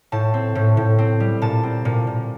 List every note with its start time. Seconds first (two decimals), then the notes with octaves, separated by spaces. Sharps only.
0.12 A2 A5
0.34 C4
0.55 A2
0.77 A2
0.98 C4
1.20 G3
1.42 A#2 A5
1.63 C4
1.85 A#2
2.07 A#2